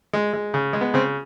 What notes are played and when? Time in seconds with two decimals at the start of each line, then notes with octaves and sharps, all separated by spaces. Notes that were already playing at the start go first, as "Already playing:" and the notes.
0.13 G#3
0.33 G#3
0.54 C#3
0.73 G#3
0.81 B3
0.94 C#3 C4